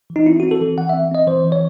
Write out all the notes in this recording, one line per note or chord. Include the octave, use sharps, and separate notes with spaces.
E3
D#4
C4 E4
C4 F#4
A4
E3
E3 F#5
E5
C4
C4 D#5
E3 C5
E3
C#5